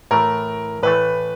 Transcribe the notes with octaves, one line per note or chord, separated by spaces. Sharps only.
A2 E3 A3 A#4
A2 E3 A3 B4